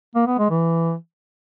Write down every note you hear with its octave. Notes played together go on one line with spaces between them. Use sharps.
A#3
B3
G#3
E3